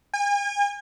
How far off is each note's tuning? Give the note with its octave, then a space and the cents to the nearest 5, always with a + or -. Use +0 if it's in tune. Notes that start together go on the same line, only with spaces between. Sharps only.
G#5 -40